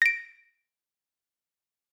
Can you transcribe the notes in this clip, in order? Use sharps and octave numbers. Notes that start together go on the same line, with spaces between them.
A#6 D7